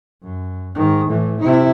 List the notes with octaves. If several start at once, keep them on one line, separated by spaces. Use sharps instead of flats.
F#2
G#2 D#3
A2 E3
C3 E4